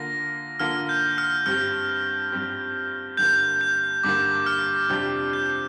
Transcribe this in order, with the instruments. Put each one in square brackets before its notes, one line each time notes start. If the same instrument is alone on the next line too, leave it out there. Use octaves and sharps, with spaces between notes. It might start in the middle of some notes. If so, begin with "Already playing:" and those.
Already playing: [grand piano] D3 A#3 F4 [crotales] A#6
[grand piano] D3 A#3 F4 [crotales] F6
[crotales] G6
F6
[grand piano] G2 G3 C4 G4 [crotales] F6
[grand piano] G2 G3 C4 G4
[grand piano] G2 D3 G3 A#3 [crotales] G6
[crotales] G6
[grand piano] G2 D3 G3 A#3 [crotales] D6
[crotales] F6
[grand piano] F2 C3 G3 D4 G4 [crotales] F6
[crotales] G6